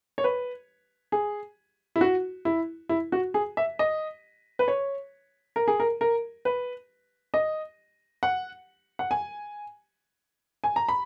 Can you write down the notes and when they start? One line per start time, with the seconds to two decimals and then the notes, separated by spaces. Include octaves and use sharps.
0.18 C#5
0.24 B4
1.12 G#4
1.96 E4
2.01 F#4
2.45 E4
2.89 E4
3.12 F#4
3.34 G#4
3.57 E5
3.79 D#5
4.59 B4
4.68 C#5
5.56 A#4
5.68 G#4
5.80 A#4
6.01 A#4
6.45 B4
7.34 D#5
8.23 F#5
8.99 F#5
9.11 G#5
10.64 G#5
10.76 A#5
10.89 B5